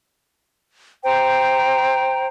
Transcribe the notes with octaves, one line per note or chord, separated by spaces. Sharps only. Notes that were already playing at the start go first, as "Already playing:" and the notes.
C5 G5 A#5